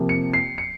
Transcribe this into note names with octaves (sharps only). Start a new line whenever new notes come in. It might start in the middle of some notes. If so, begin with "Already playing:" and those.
Already playing: C3 F3 A#3
C#7
C7
C#7